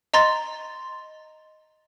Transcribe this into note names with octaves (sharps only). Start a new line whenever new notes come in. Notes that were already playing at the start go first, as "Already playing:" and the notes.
D#5 A#5 C6 A6